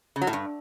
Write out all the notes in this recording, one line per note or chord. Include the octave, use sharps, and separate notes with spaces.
C#3
F#3
A2
G2